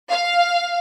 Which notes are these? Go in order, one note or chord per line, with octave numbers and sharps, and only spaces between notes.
F5